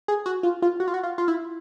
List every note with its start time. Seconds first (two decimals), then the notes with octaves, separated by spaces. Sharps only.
0.08 G#4
0.26 F#4
0.43 F4
0.62 F4
0.80 F#4
0.88 F4
0.94 F#4
1.03 F4
1.18 F4
1.28 E4